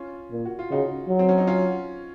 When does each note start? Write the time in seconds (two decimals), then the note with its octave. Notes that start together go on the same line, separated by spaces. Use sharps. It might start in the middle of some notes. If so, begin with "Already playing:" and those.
Already playing: C#4 F4
0.32 A#2
0.45 F#4
0.59 F4
0.70 C#3 D#4 F#4
1.08 F#3
1.19 C4
1.29 C#4
1.38 D#4
1.47 C#4 F4